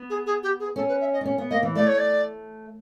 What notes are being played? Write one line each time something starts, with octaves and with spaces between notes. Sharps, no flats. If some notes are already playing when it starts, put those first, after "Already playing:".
Already playing: B3
G#4
G#4
G4
G#4
C#4 A4
B4
E5
D#5
D4
C#4
B3
A#3 D#5
E3
A3 D5
C#5
D5